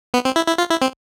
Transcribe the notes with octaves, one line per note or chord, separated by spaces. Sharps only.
B3
C4
E4
E4
F4
E4
C4